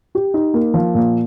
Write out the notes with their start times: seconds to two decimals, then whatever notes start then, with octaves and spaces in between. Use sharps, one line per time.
0.15 G4
0.34 D#4
0.54 A#3
0.74 F3
0.94 A#2